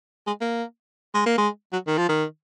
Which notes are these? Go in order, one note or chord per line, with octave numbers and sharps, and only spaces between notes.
G#3
A#3
G#3
A#3
G#3
F#3
D#3
F3
D#3